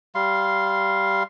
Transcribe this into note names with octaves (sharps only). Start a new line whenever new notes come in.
G3 F5 C6